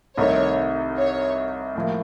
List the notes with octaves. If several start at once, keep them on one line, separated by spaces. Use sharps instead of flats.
C2 C3 D#3 A3 D#4 C#5
C#5
A2 F3 A#3